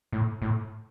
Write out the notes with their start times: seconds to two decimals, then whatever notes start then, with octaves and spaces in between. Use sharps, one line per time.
0.12 A2
0.42 A2